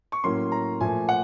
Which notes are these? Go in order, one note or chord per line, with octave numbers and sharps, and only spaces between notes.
C#6
A2 F#3 A#3 C#4 C6
A#5
A#2 F3 A3 G#5
F#5